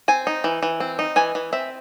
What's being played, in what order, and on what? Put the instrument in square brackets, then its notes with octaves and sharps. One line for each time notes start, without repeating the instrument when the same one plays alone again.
[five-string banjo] C4 G#5
D#4
E3
E3
C4
D#4
E3 G#5
E3
C4 E5